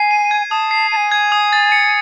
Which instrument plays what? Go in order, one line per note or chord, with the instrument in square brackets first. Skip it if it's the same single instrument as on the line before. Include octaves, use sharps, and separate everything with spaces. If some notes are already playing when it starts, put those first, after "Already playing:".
Already playing: [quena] G#5 [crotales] C7
[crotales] D#7
G#6
[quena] A5 [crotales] D#6
[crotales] C7
[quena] A5 [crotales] D#7
[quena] G#5
[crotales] G#6
D#6
A6
C#7